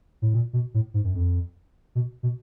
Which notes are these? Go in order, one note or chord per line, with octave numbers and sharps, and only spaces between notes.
A2
A#2
B2
A2
G#2
F#2
F2
B2
B2